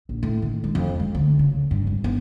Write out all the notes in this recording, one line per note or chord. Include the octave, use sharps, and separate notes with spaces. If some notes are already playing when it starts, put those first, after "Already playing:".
A#1
A2
D#3
G#3
F2
G#3
D2
C#3
G2
G#1
B3